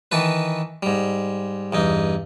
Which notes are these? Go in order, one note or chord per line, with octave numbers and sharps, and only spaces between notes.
D#3 E3 A4 B4
G#2 G3
E2 G2 D#4